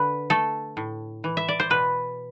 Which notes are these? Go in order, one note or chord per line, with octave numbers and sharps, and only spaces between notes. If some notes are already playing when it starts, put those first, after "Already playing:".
Already playing: D3 B4
A3 A4
A2
E3
E5
D5
C5
B2 B4